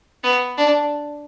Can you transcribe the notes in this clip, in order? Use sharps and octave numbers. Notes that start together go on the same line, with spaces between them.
B3
D4